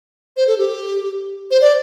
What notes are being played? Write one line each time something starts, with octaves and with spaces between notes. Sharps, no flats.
C5
A4
G4
C5
D5